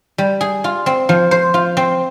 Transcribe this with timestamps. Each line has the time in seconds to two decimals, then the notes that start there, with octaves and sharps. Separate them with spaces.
0.18 G3
0.41 G#4
0.64 F4
0.86 C4
1.09 F3
1.31 C5
1.54 F4
1.77 C4